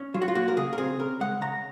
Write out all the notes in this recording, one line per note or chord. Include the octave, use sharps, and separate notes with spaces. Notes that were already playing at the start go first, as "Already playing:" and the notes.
Already playing: C#4
F#3 F4
F#4
F4
A#3 F#4
A#4
C#3 G#4
A#4
C4 G#4
C#3 A#4
G#3 F#5
C#3 A#5